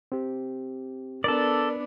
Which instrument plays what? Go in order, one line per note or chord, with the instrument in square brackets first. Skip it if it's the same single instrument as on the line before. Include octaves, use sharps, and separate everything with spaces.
[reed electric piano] C4 G4
[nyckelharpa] B3 D4 [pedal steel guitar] A4 D5 [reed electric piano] A#4